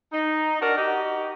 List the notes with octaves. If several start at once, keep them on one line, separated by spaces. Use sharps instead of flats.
D#4
D4 F#4 A#4
D#4 F#4 G4